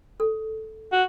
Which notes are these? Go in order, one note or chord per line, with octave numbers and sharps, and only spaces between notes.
A4
F#4